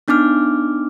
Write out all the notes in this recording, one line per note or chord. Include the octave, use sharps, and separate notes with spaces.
B3 D4 D#4 D6 F6